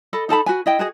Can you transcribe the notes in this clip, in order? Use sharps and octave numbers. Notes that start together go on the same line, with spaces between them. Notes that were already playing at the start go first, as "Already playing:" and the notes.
A4 D#5 B5
D#4 A4 A5 B5
F#4 B4 G#5
E4 D#5 G5
F#4 G#4 D#5